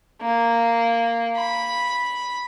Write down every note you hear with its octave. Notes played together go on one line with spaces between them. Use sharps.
A#3
B5